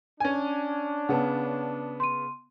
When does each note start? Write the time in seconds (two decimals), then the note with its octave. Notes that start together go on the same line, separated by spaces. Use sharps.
0.20 C#4 D4 G#5
1.09 C#3 B3 F#5 A5
2.00 C6 D#7